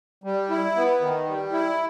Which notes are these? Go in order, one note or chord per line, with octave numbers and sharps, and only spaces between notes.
G3
E4
B3
D#3
G3
E4